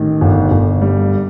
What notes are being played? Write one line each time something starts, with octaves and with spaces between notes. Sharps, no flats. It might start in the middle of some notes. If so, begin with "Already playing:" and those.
Already playing: A1 D#3
G1
G1
G3